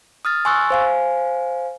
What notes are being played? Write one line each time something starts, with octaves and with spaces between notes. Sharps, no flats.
D#6 F6 A6
G#5 C6 C#6 E6 F#6 A6
C5 F5 G#5